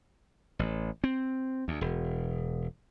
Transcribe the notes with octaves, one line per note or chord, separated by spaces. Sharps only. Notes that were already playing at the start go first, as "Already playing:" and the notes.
A1
C4
D2
E1